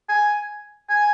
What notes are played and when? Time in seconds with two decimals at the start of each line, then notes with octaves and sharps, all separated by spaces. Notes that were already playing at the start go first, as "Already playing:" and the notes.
0.09 G#5
0.89 G#5